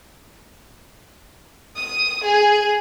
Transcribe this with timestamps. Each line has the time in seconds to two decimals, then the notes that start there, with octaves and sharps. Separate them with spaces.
1.75 D#6
2.25 G#4